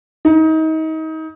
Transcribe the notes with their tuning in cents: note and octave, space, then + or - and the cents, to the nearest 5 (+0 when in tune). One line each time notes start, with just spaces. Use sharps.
D#4 +30